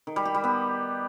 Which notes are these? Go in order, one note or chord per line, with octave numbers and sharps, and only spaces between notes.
D#3
G3
G4
G3
B3